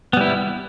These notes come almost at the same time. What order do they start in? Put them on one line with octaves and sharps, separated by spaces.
B3 G3 E4